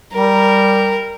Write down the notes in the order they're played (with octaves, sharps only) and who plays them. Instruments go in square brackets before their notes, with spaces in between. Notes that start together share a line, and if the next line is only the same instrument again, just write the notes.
[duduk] G3 [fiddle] A#4